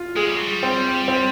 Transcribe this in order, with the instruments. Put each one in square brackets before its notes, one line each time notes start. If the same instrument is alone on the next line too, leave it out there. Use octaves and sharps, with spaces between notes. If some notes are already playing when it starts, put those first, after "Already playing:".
Already playing: [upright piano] F4
[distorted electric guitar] G#3 [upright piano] G#4
[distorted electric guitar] G3
F#3
G3
[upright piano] C4
C4